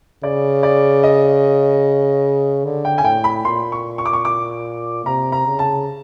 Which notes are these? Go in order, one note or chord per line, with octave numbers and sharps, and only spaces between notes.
C#3 D5
D5
D#5
D3
G5
G#5
A2 G5
B5
A#2 C6
C#6
C#6
D6
C#6
D6
C3 A#5
A#5
C#3
A5